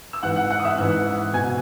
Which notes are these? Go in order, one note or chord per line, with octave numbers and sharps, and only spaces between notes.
E6
G#2 E3 F#5 F#6
F#5 F#6
F#5 F#6
D#6
E5 E6
G#2 E3 F#5 F#6
B2 G#5 G#6